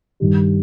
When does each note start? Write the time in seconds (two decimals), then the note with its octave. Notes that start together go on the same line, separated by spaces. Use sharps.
0.20 G2 D#3 G3